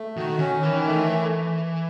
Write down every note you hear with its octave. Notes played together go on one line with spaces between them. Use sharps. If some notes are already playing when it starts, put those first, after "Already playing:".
Already playing: A3
D#3 F#4
D#3 C#4
D#3 E3
A3